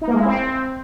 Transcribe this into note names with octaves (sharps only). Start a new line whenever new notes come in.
D#4
A#3
G#3
E4
C4